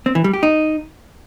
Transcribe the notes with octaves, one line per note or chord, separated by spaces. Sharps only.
C4
E3
G3
G4
D#4